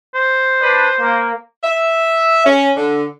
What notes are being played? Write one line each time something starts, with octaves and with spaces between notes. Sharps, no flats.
C5
D4 B4
A#3
E5
C#4
D3